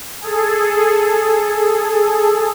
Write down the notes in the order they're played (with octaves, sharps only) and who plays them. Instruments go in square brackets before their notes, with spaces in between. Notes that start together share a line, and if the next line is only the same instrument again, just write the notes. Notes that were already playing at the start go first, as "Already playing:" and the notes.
[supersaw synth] G#4 A4